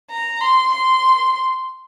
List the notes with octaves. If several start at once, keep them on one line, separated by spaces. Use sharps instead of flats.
A#5
C6
C6